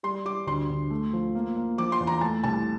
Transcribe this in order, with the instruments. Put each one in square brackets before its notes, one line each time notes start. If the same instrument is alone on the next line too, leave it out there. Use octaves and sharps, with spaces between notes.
[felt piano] G3 C6
G3 D6
D2 C6
D2
A3
F3
A#3
A#3
F3 D6
C6
E2
A#5
A3 A5
C2 A5